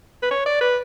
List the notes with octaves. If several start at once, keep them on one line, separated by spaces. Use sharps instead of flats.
B4
C#5
D5
B4